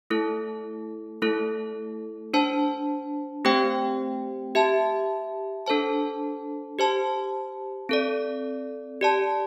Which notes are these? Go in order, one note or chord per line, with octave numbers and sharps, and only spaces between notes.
A3 E4 A4
A3 E4 A4
D4 C5 A5
A3 C4 G4 C5 G5
G4 E5 A5
D4 A4 C5 A5
G4 C5 A5
C4 A4 D5
G4 D5 A5